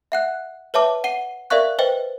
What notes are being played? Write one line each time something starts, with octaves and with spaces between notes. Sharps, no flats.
E5 F#5 F#6
B4 C#5 E5 A5 D6
F#5 C7 D#7 G7
A#4 D5 E5 F5 C#6 F#6
B4 C5 D#5 G5